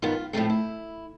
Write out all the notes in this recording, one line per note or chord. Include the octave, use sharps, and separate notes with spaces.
G2 D#3 G3 B3 F4
A2 F3 A3 C4 F4
E4